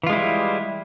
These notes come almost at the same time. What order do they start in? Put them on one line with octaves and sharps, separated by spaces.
E3 F4 G#3 E4 G3